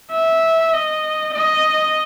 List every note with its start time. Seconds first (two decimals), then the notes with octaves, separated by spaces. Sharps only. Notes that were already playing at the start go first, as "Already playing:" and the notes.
0.12 E5
0.73 D#5
1.34 D#5